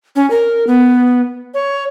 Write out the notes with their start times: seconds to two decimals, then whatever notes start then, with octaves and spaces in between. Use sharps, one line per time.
0.16 C#4
0.30 A#4
0.67 B3
1.54 C#5